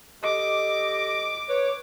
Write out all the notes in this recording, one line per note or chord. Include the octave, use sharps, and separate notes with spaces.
G4 A4 D#5 D6
B4 C#5